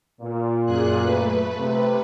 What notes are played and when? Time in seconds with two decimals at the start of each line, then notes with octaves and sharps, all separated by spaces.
0.22 A#2
0.66 F#2 G#4 F#6
1.02 A3 B4
1.59 C3